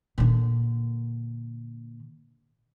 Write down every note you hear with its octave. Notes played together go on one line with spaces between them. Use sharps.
A#2 D3